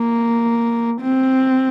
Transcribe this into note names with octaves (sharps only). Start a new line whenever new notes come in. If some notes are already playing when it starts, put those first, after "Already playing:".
Already playing: A#3
C4